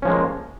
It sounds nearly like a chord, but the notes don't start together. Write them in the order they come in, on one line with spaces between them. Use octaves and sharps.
C#4 F3 G#3 A#3